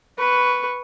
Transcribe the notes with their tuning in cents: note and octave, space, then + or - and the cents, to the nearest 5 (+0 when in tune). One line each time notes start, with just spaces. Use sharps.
B4 +0 C#6 +0